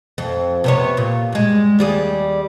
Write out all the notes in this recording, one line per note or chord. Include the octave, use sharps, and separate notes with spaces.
F2
C3 B3 C#5
A#2
G2 G#3
D#2 G3 G#4